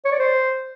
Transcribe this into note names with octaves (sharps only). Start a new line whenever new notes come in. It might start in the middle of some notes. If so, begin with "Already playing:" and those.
C#5
D5
C5